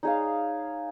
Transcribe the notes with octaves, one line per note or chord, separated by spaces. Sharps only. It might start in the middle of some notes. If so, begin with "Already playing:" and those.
D#4 G#4 C#5 F5